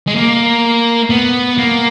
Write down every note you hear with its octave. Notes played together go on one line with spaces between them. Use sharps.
G#3
A#3
B3
A#3